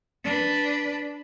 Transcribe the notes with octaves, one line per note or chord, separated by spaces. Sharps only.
D4 B4